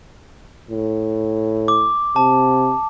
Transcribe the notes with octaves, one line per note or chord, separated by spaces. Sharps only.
A2
D6
C3 A5